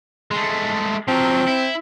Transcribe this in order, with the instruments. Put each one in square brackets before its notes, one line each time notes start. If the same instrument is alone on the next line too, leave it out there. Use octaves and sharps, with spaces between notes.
[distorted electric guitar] G#3 A3
[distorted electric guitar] F3 F#3 [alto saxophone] C4
[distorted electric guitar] E4